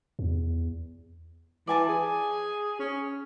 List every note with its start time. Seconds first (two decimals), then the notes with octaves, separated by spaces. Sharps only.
0.19 E2
1.67 E3 D5 G#5 A5
1.88 G#4
2.79 C#4